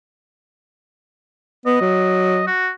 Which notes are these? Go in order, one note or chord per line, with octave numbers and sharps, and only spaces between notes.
B3 D#5
F#3
F#4